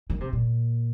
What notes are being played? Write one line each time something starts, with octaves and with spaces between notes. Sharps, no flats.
D#3
C3
A#2